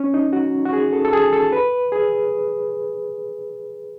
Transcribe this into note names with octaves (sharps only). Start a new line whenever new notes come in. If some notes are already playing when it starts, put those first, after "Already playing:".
Already playing: C#4
D#4
F#4
F#4
G#4
A4
A4
G#4
A4
B4
G#4